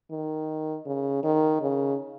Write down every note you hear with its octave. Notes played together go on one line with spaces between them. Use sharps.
D#3
C#3
D#3
C#3